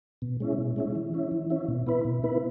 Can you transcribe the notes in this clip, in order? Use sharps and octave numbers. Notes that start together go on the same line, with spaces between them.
B2
G#3 C#4 E4
B2
G#3 C#4 E4
E3
C#4 E4
E3
C#4 E4
B2
B3 E4 B4
B2
B3 E4 B4